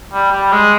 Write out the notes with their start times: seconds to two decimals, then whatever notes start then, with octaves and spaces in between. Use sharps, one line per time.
0.14 G3
0.32 G3
0.53 G#3